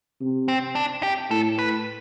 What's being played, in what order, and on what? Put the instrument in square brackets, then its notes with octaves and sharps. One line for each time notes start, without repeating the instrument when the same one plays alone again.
[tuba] C3
[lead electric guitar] C4
D4
G4
[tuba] A2 [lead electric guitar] A4
[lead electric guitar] B4